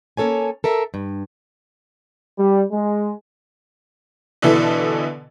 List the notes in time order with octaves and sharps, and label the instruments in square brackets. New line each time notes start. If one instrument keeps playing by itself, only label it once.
[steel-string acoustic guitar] A#3 C#4 A4 C#5 G#5
A4 A#4 E5
G2
[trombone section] G3
G#3
[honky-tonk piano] B2 D3 E3 E4 A4